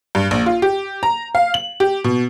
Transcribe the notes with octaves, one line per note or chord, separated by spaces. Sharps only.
G2
A#1
F4
G4
A#5
F5
F#7
G4
B2